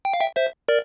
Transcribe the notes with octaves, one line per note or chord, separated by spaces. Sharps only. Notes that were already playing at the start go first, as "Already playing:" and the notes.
G5
F5
E5 G5
C5 E5
A#4 D5